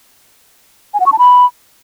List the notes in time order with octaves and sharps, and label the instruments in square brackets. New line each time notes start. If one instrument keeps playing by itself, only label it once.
[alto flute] G#5
F#5
C#6
A5
B5